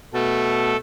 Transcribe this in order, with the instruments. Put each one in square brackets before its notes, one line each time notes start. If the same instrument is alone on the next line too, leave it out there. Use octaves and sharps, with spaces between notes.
[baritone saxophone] B2 [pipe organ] A3 A4